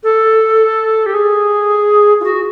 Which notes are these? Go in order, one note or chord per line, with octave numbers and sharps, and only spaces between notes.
A4
G4
G#4
F4
F#4